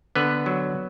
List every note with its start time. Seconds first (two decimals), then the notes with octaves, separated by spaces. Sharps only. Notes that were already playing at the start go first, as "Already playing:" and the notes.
0.15 D3 B3 B4
0.46 F#3